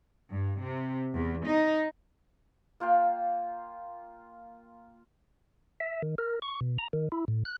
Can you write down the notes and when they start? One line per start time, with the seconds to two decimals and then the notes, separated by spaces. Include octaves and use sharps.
0.30 G2
0.61 C3
1.15 E2
1.47 D#4
2.80 A#3 F4 F5 G5
5.80 E5
6.02 D#3
6.18 A#4
6.42 C#6
6.61 B2
6.78 A#5
6.93 D#3
7.12 E4
7.28 A2
7.45 F#6